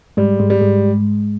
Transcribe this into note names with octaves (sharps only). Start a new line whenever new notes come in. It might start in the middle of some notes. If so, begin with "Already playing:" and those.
G#2 G3 G#3
G#2 G#3
G3
G#2 G#3